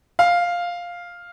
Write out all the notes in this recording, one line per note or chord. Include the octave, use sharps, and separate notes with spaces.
F5